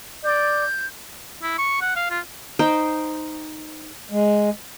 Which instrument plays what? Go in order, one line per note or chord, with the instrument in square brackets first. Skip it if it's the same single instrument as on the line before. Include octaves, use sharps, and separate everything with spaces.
[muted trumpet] D5 [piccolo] G6
[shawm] E4
C#6
F#5
F5
F4
[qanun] D#4 C5 G5
[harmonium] G#3